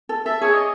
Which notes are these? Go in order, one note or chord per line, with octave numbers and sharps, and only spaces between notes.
A4
A4 E5
G#4 C#5
D#5